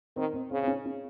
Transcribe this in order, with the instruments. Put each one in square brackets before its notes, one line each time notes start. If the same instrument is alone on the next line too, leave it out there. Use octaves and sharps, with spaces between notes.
[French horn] D#3 [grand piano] C4
[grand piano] C4
[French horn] C#3 [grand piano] C4
[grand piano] C4
C#4
C#4